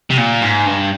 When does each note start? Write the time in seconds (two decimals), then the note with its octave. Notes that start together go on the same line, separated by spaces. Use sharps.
0.10 C3
0.17 A#2
0.41 G#2
0.66 G2